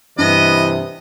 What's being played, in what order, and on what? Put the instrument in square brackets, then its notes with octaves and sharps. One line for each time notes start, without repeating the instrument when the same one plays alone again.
[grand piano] G2 [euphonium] C3 [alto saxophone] E3 [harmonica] B3 D#5